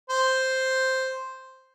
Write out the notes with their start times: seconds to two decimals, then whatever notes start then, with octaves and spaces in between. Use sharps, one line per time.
0.10 C5